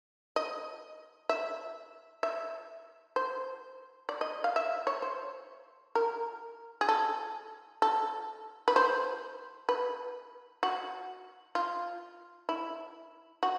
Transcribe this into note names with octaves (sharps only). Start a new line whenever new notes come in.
D#5
E5
E5
C5
D5
D#5
F5
E5
C#5
C5
A#4
G#4
A4
A4
B4
C5
B4
F#4
F4
E4
F#4